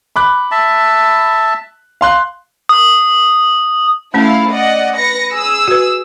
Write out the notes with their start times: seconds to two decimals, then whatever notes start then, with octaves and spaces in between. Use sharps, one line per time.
0.16 B5 D6 F#6
0.51 E5 A5
2.01 F5 C6 F#6
2.69 D#6
4.14 A3 C#4 E4 A4 F5 A5
4.50 D5 D#5 F#5
4.97 B4 A#6 C#7
5.32 G#4 D#6 E6
5.68 F#4 B4